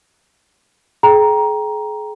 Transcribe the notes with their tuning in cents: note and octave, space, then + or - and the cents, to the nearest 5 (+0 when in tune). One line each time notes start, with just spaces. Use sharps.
G#4 +35 G5 +0 A#5 +10